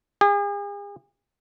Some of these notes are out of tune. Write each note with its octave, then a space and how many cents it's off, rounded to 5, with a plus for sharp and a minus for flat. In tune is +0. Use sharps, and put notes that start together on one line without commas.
G#4 -40